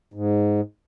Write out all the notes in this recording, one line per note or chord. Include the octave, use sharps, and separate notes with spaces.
G#2